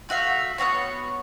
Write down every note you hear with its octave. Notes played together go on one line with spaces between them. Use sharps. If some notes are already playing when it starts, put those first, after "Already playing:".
A3 F#4 E5 F5
B3 C4 F#4 C#5